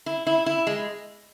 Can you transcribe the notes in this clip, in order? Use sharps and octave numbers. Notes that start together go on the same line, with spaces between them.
E4
E4
E4
G#3